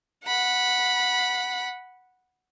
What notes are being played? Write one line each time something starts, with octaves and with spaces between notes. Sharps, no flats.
F#5 B5